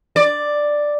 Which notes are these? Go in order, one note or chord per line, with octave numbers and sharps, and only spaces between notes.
D5